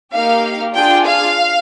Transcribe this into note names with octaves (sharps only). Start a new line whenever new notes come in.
A#3 D#4 G4 F5
D4 F4 G#4 G5
F5